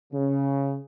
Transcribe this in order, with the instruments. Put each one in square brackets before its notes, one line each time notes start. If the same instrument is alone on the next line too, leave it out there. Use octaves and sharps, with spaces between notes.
[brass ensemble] C#3